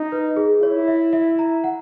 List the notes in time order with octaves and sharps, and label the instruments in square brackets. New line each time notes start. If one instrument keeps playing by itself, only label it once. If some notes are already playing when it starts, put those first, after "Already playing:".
Already playing: [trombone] D#4
[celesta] B4
G#4
[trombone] E4 [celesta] C#5
[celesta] E5
E5
A#5
F#5